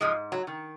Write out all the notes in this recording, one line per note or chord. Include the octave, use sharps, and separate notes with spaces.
G#2 F3 G#3
F#3
D#3